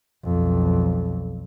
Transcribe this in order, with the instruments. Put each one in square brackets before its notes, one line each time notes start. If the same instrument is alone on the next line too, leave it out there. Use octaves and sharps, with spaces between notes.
[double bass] B1 F2